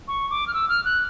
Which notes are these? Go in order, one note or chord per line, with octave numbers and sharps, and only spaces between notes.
C#6
D6
F6
E6
F6
F#6